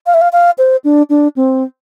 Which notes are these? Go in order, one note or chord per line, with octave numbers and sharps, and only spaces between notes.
F5
E5
F5
F5
C5
D4
D4
C4